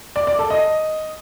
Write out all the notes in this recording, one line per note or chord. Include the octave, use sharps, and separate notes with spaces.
D5
D5
A4
D#5